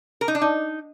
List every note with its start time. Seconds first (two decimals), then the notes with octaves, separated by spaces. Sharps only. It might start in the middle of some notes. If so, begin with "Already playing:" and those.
0.21 A#4
0.28 D#4
0.35 D4
0.42 D#4